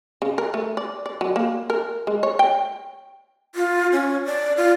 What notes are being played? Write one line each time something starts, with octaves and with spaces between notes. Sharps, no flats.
C#3
A#4
A3
D5
D5
F#3
A#3
A#4
G#3
C#5
G5
F4
C#4
D5
F4